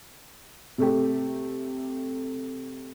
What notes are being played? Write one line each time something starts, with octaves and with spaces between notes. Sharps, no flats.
C3 A3 G4